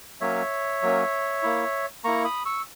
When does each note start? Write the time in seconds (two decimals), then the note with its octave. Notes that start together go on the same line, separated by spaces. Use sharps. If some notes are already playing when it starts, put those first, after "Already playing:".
0.21 F#3 A#3 C#4 C#5 E5
0.82 F#3 A#3 C#4
1.43 A#3 E4
2.04 A#3 E4 A#5 C#6
2.25 B5 D#6
2.45 C#6 E6